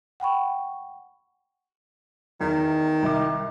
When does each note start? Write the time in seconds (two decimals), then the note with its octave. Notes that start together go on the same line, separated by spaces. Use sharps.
0.20 F#5 G5 B5 C#6
2.41 E2 D#3
3.02 C2 D#4 D6